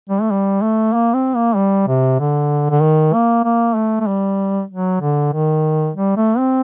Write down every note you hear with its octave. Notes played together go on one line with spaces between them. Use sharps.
G3
A3
G3
A3
A#3
C4
A#3
G3
C3
D3
D3
D#3
A#3
A#3
A3
A3
G3
F#3
D3
D#3
G3
A3
C4